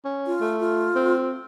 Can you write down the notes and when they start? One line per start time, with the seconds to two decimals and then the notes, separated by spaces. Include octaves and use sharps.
0.05 C#4
0.27 F4
0.41 A3
0.60 F4
0.95 C4